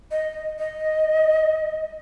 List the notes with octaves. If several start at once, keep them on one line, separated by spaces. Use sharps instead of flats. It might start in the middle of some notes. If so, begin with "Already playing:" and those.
D#5
D#5